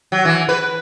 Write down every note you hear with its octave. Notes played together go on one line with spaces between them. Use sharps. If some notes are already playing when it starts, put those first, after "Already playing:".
F#3
E3
B4